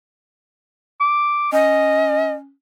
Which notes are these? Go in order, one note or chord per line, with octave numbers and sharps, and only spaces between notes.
D6
C#4 D#5